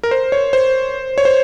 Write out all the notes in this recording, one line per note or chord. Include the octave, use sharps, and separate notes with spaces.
A#4
C5
C#5
C5
C#5
C5